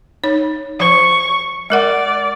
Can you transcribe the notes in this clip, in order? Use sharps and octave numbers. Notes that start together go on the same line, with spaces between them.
D#4 C#5
F3 C5 C#6
G#3 A#4 D5 F#5